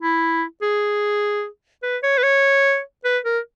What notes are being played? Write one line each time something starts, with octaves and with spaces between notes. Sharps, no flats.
E4
G#4
B4
C#5
B4
C#5
B4
A#4